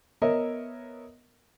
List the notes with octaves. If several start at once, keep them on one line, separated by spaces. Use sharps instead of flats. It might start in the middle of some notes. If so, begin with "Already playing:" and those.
B3 A#4 C#5 D#5 E5